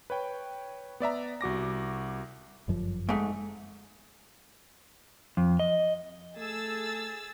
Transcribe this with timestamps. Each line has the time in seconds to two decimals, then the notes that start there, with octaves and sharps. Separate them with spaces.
0.10 B4 C#5 G5
1.00 B3 D5 E5 A#5
1.41 C2 F#4 D6 A#6
2.68 G1 F#2 F3
3.09 G#2 A3
5.37 F2
5.60 D#5
6.37 A3 G#4 E6 A6